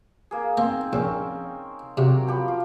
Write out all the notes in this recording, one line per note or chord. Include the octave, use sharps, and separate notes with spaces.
A#3 G#4
A#3 C4 D#4
A#1 C4 C#4 A#4
C3 F#3 F#4 G4
F3 G4 B5
F4